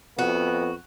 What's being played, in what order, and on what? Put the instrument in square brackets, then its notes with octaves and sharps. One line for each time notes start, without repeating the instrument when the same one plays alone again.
[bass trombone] F2 [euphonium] B3 [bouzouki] F#4